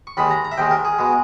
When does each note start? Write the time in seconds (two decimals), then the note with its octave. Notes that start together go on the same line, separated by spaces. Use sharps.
0.07 C#6
0.17 D#2 D#3 G#3 B5
0.31 A#5
0.45 A#5
0.52 E5
0.58 D#2 D#3 G#3 G5
0.71 A#4
0.85 G#4
0.99 B2 G#3